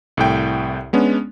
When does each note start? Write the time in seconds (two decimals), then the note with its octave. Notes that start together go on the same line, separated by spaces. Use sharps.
0.17 C2 A2 G5
0.93 G#3 B3 C#4 D4